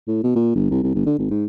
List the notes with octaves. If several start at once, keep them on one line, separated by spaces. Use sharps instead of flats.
A2
B2
A#2
G1
C2
C2
G1
D3
G#1
G#2